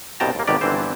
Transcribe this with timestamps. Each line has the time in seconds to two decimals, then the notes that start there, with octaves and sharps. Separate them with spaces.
0.20 C2 G2 B2 G5 A5 A#5
0.35 D#2 A#3
0.47 G#1 B2 D#3 G4 D5
0.61 G1 D3 E3 C4 C5